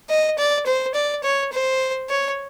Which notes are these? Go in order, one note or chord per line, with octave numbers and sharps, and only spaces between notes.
D#5
D5
C5
D5
C#5
C5
C#5